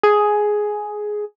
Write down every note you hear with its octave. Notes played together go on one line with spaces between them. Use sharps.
G#4